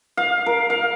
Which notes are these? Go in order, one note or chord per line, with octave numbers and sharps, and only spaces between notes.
F5
A#4
F5